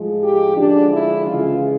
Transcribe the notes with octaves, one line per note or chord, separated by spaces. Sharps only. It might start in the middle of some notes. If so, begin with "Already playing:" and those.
Already playing: A2 F3 G#3
G4
D3 F3 G#3 D4
E4
C#3 E3 G#3 F4